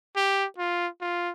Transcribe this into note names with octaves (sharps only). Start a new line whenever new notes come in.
G4
F4
F4